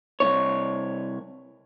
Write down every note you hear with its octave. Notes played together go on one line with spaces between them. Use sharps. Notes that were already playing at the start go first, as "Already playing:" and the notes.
C2 B2 C#5